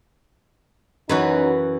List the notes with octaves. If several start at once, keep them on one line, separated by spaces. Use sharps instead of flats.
F#2 E3 F#3 C#4 D#4 F#4 B4